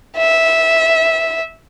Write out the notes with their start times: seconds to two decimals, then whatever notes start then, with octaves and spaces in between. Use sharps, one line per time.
0.18 E5